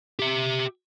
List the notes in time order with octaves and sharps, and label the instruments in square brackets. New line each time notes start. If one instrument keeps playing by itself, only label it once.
[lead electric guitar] G4 E5